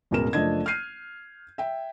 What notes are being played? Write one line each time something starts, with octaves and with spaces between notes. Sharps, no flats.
E1 A1 B2 G#3 A#4 E7
F#1 F3 A3 D4 D#5 G#6
F6 G6 C7 D#7
E5 G5